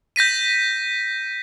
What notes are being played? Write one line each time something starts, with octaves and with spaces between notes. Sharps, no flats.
G6 A#6 B6 D#7